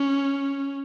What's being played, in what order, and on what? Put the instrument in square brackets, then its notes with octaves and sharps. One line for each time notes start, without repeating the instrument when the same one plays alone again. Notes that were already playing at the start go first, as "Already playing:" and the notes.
Already playing: [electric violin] C#4